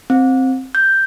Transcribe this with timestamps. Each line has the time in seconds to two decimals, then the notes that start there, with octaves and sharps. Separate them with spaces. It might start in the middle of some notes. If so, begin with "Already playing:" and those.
0.10 C4
0.75 G6